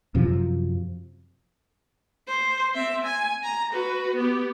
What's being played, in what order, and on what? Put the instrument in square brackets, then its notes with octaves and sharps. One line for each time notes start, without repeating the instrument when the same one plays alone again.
[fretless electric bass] F#2 C3 F3
[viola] C5
C4 E5
G#5
A#5
F#4 B4
B3 G4